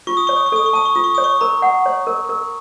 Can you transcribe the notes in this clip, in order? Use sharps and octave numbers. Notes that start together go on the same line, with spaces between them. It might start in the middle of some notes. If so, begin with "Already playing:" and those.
F4 C#6
D#6
C#5 C#6
D#6
C#6
A4 D#6
C#6
A5 D#6
C#6
F4 D#6
C#6
C#5 D#6
C#6
A#4 A#5
F#5
C#5
A#4
A#4